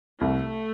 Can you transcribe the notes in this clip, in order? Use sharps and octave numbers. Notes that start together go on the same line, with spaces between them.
C2 A3